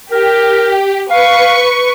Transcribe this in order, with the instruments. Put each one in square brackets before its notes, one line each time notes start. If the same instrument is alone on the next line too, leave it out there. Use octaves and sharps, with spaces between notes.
[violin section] G4 [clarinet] A#4
[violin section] B4 C#6 C#7 [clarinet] F5